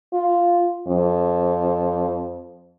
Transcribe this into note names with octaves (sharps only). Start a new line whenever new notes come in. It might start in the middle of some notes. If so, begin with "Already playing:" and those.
F4
F2